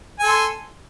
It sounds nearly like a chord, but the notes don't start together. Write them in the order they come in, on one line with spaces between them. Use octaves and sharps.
G#5 A4 C6